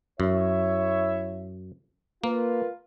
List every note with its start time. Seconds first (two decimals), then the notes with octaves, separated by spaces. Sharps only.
0.20 F#2 E4 C#5 E5
2.24 A#3 F4 A#4 B4